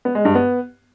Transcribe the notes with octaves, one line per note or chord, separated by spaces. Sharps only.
B3
G#3
G2
B3